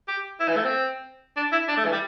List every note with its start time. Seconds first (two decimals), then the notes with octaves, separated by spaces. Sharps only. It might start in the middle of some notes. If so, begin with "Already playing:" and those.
0.08 G4
0.40 E4
0.48 E3
0.56 A3
0.65 C4
1.37 D4
1.52 E4
1.68 D4
1.77 A3
1.85 E3
1.92 G3